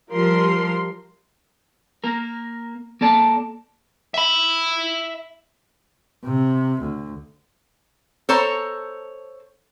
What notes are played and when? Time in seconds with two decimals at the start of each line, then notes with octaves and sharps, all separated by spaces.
0.12 F3 G3 A#4 C6
2.04 A#3 A#4
3.01 A#3 A4 D5 A5
4.14 E5 B5
6.24 C3
6.81 D2
8.29 A4 C5 C#5 A#5